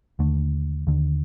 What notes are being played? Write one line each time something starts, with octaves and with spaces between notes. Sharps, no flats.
D#2 D3 A3
D#2 D3